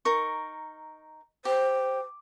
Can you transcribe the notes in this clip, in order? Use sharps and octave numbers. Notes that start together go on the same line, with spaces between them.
D#4 A#4 C#6
G4 C5